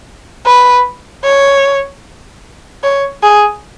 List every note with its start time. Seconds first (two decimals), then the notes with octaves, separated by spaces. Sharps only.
0.46 B4
1.24 C#5
2.83 C#5
3.23 G#4